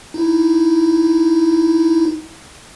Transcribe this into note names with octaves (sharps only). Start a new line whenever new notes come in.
D#4 E4